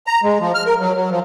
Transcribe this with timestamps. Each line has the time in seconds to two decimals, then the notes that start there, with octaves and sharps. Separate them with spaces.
0.07 A#5
0.23 G#3
0.40 F3
0.54 F6
0.66 A#4
0.80 F#3
0.95 F#3
1.10 F3